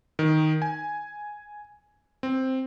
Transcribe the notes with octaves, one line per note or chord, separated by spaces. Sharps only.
D#3
G#5
C4